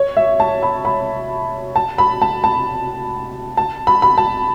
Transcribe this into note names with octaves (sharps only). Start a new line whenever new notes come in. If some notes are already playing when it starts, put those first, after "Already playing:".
Already playing: C#5
E5
A5
B5
B5
A5
B5
A5
A5
A5
B5
B5
A5